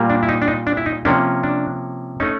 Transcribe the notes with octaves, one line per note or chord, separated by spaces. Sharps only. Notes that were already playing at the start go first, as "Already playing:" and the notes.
Already playing: A#2 G3 A#3
D4
E4
D#4
D4
D#4
D4
E4
D#4
C3 F3 A#3 C#4 D4
D4
A3 C#4 D#4